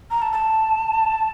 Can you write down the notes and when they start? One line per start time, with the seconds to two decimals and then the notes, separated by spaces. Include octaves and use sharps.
0.11 A#5
0.22 A5
0.32 A5